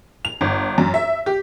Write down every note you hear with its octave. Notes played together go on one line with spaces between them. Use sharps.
F7
G1
F#2
E5
G4